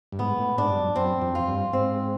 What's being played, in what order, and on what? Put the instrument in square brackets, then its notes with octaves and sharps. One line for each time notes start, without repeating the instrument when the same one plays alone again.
[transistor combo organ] G2
[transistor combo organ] G#2 [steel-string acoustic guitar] B3
[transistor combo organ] A2
[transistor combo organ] G#2 [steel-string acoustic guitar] D4
[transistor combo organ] G2
F#2
[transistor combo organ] F#2 [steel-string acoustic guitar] C4
[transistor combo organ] F2
[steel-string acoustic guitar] F4
[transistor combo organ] G2
[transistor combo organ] G#2 [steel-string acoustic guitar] C4